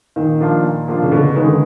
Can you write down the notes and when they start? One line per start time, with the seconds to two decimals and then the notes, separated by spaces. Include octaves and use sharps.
0.16 A#2 D#3
0.41 F3 A#3 D4 F4
0.64 A#2
0.88 F3 A#3 D4 F4
1.02 C#3
1.12 B2 D3
1.23 C#3
1.35 D#3 G#3 B3
1.47 D3